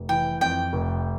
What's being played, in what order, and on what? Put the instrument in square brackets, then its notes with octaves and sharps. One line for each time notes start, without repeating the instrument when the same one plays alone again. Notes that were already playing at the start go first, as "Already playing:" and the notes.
Already playing: [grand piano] F1
[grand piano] E3 [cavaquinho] G5
[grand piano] F2 [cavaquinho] G5
[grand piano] F1